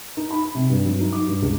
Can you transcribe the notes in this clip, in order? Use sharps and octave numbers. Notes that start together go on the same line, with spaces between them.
D#4
B5
C3
G2
F#3
D#4
D6
G2
C#2